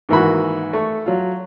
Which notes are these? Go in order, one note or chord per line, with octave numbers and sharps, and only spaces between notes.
G#2 D#3 E3 A#3 F#4 B5
A3 C#6
F#3 F4